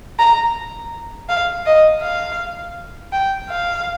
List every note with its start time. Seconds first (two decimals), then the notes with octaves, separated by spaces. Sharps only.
0.19 A#5
1.29 F5
1.66 D#5
2.02 F5
3.12 G5
3.49 F5